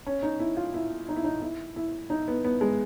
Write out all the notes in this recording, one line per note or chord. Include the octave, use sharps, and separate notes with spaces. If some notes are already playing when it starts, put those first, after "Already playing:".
C#4
D#4
E4
F4
E4
D#4
E4
D#4
E4
E4
D#4
B3
B3
G#3